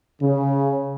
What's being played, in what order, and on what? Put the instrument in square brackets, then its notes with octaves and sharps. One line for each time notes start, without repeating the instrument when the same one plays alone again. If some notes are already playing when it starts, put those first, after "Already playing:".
[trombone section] C#3